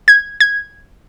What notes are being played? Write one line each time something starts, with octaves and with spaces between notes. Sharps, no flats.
G#6
G#6